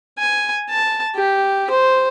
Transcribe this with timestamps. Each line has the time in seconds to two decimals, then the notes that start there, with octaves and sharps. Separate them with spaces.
0.18 G#5
0.70 A5
1.15 G4
1.70 C5